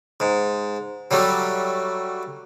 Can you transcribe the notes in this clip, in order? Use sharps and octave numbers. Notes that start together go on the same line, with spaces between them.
G#2
F#3 G3 A3